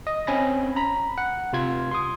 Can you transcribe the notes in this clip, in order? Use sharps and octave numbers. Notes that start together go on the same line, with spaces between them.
D#5
C4 C#4 G#5 B5 A#6
A#5 B5
F#5
C3 F4 G#6
C6 D#6